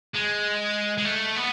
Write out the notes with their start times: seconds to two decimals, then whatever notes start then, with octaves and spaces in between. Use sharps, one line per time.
0.15 G#3
0.98 G#3
1.05 A3
1.36 B3